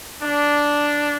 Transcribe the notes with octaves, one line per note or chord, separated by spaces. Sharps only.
D4